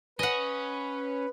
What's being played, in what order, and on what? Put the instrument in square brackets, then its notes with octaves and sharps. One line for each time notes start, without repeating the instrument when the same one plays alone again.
[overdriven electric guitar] C#4 [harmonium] B4 [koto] D#5 F#5